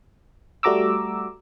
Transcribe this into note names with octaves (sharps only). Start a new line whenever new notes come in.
G3 A3 F#4 A#5 D6 E6